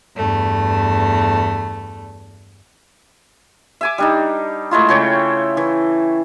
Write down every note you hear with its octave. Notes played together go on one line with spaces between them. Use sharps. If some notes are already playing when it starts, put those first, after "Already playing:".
E2 G2 A3
E5 G#5 D6
G3 D4 D#4
G#3 A3 E4 F4
C#3 A4 C#5 G5
E3